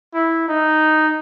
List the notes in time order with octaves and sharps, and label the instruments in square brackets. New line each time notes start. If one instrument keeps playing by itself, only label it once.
[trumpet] E4
D#4